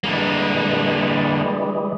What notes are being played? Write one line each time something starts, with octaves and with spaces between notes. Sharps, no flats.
D3 E3 G3 G#3 A#3